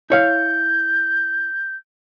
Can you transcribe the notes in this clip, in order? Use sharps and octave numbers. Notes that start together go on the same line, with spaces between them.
E4 C#5 F5 G6